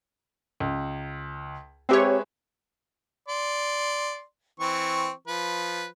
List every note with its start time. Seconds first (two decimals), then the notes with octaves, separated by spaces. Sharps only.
0.60 C#2
1.89 G#3 C4 G4 B4 C#5 E5
3.28 D5 C6
4.60 E3 C4 C#6
5.28 F3 B4